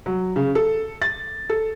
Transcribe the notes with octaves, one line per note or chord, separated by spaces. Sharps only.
F#3
C#3
A4
A6
A4